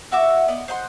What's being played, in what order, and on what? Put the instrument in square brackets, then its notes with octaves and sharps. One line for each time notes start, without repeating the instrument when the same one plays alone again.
[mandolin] E4 F#4 E5 D6
B3 D5 D#5
C5 D#5 F#5 C6